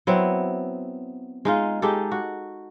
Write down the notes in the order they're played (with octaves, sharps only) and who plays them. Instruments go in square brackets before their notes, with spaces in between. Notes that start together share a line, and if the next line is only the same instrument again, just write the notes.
[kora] F#3 B3 C4 E4
G#3 D#4 F4
G#3 D#4 G4 A4
F#4